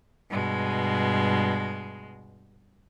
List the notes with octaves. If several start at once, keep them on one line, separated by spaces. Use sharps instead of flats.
G2 B2 G#3